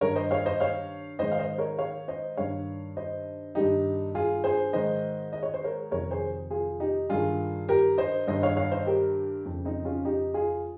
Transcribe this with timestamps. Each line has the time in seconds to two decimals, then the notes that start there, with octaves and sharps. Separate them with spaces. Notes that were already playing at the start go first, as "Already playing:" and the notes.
0.01 G2 D#3 A#4 C#5
0.16 C5 D#5
0.31 C#5 F5
0.46 C5 D#5
0.60 C#5 F5
1.19 G#2 D#3 C5 D#5
1.32 F5
1.39 C5 D#5
1.58 A#4 C#5
1.78 C#5 F5
2.08 C5 D#5
2.37 G2 D#3 C#5 F5
2.97 C5 D#5
3.55 G2 D#3 D#4 G4
4.15 F4 G#4
4.44 G#4 C5
4.73 G#2 D#3 C5 D#5
5.33 D#5
5.43 C#5
5.54 C5
5.64 A#4 C#5
5.91 F2 C3 D#3 A#4 C#5
6.11 G#4 C5
6.50 F4 G#4
6.80 D#4 G4
7.09 G2 D#3 F4 G#4
7.69 G4 A#4
7.98 C5 D#5
8.27 G2 D#3 C5 D#5
8.43 C#5 F5
8.57 C#5 F5
8.72 C5 D#5
8.87 G4 A#4
9.45 F2 C#3
9.65 C4 D#4
9.85 C#4 F4
10.05 D#4 G4
10.34 F4 G#4